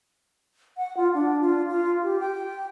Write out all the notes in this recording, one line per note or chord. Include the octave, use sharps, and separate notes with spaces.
F#5
F4
D4
F4
F4
G4
G5